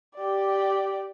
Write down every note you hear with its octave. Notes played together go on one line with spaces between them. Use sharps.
G4 D5